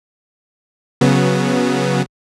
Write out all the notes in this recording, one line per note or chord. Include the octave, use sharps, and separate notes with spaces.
C#3 F#3 B3